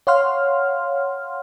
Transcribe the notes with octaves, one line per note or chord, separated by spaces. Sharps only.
C#5 F5 F#5 C6 F6